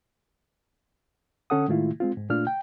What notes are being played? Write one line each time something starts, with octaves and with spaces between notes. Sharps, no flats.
D3 C#4 A4 F#5 D#6
A2 D#3 G#3 A3 E4 F4
G#3 C4 F4
G#2
A#2 A3 D4 F4 F6
G5